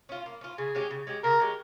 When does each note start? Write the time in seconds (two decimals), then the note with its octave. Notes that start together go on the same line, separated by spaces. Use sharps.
0.09 C#4 F4
0.26 A#3
0.41 C#4 F4
0.58 C#3 G#4
0.75 G#3 C#4 G4
0.91 C#3
1.07 G#3 C#4 G4
1.24 C#3 A#4
1.40 G#3 C#4 G4